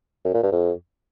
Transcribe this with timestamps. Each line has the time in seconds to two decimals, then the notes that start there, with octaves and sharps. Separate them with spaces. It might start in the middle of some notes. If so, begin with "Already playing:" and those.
0.25 F#2
0.34 A#2
0.43 G2
0.52 F2